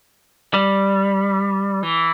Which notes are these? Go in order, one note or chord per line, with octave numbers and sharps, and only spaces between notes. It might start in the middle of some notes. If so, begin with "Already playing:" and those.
G3
E3